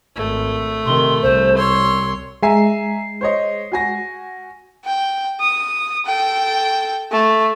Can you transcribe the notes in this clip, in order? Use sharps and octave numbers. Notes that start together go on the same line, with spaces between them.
G#1 A3
C3 D#3 C6
C2 C5
C#5 C6 E6
G#3 E5 G#5 A#5 C7
C5 C#5 D#5
F#4 G#5 A#6
G5
D#6
A4 G5
A3